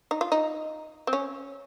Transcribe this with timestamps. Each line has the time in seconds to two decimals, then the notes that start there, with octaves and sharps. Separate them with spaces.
0.11 D#4
0.21 F4
0.32 D#4
1.07 C4
1.13 C#4